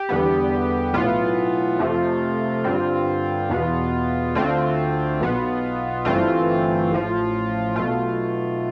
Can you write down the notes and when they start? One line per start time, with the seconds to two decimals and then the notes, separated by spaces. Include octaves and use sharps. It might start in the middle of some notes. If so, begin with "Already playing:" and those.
Already playing: G4
0.09 E2 D3 G3 B3
0.93 B1 A2 E3 B3 F4
1.79 F2 C3 F3 A3
2.64 G2 D3 G3 C4
3.49 E2 B2 B3
4.35 D2 D3 A3 C4 F4
5.20 B1 B2 B3
6.05 G1 G2 E3 A3 C4 F4
6.91 A1 A2 F3
7.76 B1 B2 A3 F4